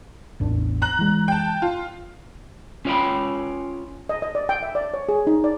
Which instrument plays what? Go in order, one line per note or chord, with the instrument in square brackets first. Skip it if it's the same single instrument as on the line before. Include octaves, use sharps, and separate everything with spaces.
[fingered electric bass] A1 E2 D4
[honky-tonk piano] A#5 F#6 F#7
[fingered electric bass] E3 G#3
[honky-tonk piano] G5 A5
F4
[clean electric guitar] C#4 F4 C#5 F#5 G5 B5
[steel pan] D#5
D#5
D5
G5
E5
D5
C#5
G#4
D#4
D5